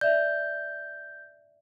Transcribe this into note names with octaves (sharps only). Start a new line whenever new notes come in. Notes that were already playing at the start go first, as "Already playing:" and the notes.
D5 E5 G6